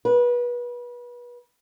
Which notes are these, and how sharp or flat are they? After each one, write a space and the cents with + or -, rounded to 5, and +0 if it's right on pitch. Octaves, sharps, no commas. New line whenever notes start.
B4 -30